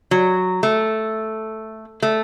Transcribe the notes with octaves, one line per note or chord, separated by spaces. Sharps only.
F#3
A3
A3